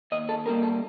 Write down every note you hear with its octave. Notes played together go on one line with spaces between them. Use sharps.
D#2 D#5
A4
D3 G3 A#3 A#4
A4